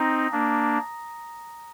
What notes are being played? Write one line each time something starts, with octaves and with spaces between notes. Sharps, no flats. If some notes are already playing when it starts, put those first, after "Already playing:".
Already playing: C4 D#4 A#5 D#6 A#6
A#3 D4